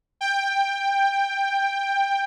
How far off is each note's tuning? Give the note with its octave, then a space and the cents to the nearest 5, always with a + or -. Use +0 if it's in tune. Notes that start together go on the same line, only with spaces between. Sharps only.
G5 +15